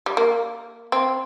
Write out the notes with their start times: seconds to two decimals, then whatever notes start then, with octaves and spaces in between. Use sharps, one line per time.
0.06 G3
0.17 A#3
0.92 C4